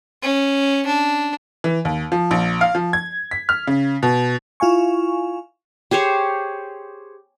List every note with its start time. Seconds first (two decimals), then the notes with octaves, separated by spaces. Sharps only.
0.23 C#4
0.86 D4
1.64 E3
1.85 D#2
2.12 F3
2.31 A#1
2.61 F5
2.75 F3
2.93 G#6
3.31 B6
3.49 F6
3.67 C#3
4.03 B2
4.60 E4 F4 F5 G#5 C#6
5.91 G4 G#4 C5 C#5